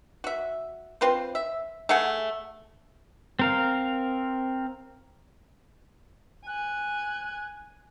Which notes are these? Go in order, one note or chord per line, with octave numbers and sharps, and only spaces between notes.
F#4 E5
C4 F4 B4 C5
E5
A3 G#4 F#5 G#5
C4 A#4 F5
G#5 F#6